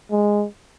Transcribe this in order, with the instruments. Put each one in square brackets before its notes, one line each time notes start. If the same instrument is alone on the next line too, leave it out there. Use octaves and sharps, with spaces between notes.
[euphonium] G#3